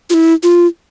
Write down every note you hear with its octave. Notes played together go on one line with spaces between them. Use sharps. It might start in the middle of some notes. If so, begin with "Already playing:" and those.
F4
E4
F4